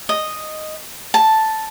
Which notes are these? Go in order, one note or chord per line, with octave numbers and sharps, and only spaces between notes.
D#5
A5